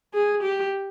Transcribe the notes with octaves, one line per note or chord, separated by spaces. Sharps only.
G#4
G4